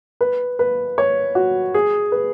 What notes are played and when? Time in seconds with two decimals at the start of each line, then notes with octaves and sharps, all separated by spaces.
0.21 B4
0.59 B4
0.98 C#5
1.35 F#4
1.74 G#4
2.12 B4